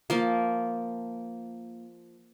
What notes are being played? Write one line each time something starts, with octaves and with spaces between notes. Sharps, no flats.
F3 A#3